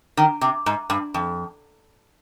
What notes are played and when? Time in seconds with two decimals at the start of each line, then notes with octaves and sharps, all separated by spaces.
0.17 D#3
0.41 C3
0.66 G#2
0.90 G2
1.14 F2